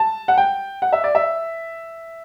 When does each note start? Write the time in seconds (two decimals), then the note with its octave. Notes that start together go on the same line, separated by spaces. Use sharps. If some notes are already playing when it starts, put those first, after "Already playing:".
Already playing: A5
0.28 F#5
0.38 G5
0.82 F#5
0.93 E5
1.04 D5
1.15 E5